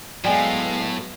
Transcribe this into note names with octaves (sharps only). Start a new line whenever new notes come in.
A2 F#3 G#3 B3 D5 F5 G5 G#5